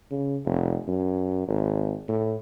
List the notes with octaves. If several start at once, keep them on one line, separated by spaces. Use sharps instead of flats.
C#3
F1
F#2
G#1
A2